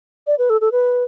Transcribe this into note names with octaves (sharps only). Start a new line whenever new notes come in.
D5
B4
A4
A4
B4